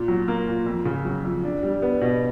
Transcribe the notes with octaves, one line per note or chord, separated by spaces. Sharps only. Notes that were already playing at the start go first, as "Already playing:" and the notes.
Already playing: A#2
F#3
A#3
A#2
F2
C#3
F#3
F2
D4
G3
B3
B2